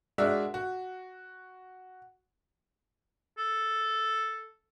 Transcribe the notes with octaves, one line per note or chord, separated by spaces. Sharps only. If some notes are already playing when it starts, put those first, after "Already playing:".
G#3 D4 F#4 A#4 E5
F#4
A4